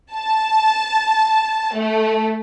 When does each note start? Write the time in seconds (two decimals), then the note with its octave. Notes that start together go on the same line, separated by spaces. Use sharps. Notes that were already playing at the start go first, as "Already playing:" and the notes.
0.14 A5
1.75 A3